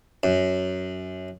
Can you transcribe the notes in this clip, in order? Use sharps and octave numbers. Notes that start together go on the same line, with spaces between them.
F#2